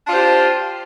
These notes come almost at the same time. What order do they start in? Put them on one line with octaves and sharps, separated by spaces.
D4 F4 C5 G4